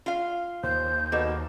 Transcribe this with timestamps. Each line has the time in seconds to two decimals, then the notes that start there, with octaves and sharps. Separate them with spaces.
0.06 F4 F5
0.63 D#2 C5 G6
1.12 B2 A#3 A4